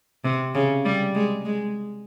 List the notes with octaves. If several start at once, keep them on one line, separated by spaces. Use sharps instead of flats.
C3
C#3
G3
G#3
G#3